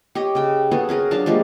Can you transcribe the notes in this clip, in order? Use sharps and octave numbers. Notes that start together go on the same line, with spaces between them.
G4 C#5 D#5
C#3 G5
B3 F#4 G#4 A4
C#4 G#4 A#4
F#3 D4 F5 A5
F3 G3 G#3 A#3